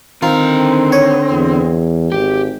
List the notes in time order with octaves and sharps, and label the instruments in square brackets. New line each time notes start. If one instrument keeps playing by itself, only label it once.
[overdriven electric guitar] D3 A#5 [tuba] D#3 [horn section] C4 [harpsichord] F4
[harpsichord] C#5
[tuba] E2
[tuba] G#1 [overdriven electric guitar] G4